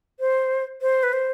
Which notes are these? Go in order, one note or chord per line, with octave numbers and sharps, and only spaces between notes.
C5
C5
B4
C5